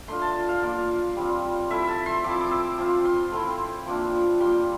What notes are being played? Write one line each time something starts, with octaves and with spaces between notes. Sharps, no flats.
A3 D4 F4 C6
A5
F5
A#3 D4 F4
G3 C4 F4
A3 E4 E5
A5
C6
F3 C4 E4 D6
D6
E6
F3 C4 F4 D6
C6
A3 C4 E4
F3 A#3 D4 F4
G3 A#3 F4 C6